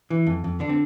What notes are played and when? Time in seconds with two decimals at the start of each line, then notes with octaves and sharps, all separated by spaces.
0.10 E3
0.27 F2
0.44 F2
0.60 D3 D4
0.69 C4